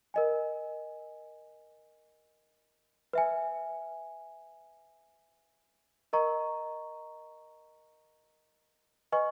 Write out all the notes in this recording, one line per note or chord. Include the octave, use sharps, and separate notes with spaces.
A#4 D#5 G#5
B4 E5 G#5
A#4 D#5 A#5 C#6
B4 D#5 G#5 C#6